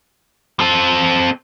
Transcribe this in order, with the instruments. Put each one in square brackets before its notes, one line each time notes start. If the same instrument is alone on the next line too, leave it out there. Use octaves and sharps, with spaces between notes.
[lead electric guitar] C4 A4